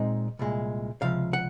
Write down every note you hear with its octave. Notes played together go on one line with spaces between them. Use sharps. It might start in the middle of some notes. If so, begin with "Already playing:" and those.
Already playing: A#2 G#3 C4 D#4 D#5
C2 A#2 G#3
C#2 C3 F3 F5
F#5